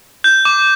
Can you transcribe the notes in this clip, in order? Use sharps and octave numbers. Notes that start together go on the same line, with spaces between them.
G6
D6